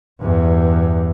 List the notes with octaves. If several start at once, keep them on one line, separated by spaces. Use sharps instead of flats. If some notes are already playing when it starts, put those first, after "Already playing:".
E2 G2